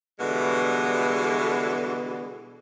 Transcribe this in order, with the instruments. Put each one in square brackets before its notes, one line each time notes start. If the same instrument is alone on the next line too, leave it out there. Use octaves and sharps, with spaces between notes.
[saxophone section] B2 D3 E3 G3 G#3